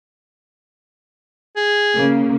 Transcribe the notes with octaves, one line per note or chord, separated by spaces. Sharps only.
G#4
C#3 A#3